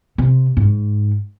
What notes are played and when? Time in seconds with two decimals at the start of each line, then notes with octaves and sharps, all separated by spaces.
0.18 C3
0.57 G#2